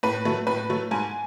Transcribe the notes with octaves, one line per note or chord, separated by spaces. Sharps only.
A2 B4
F#3 A3
A2 B4
F#3 A3
G#2 G#5